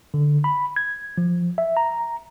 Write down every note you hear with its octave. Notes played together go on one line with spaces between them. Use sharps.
D3
B5
G#6
F3
E5
A#5